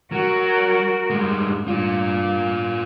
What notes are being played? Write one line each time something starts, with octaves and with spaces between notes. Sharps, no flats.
F#3 F#4 A#4
G2 G#3
G2 F4 D5